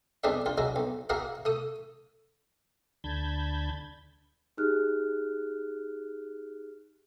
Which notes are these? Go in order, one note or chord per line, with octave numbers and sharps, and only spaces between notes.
B1 F2 G#3 D4 G#4 E5
A#1 F4
F#3 G#3 E4 F#4
B1
A#3 E4 F#4 G#4 A#4
A3 D#6
D2 D3 A5 B5 G6 G#6
D#4 G4 G#4 F6 F#6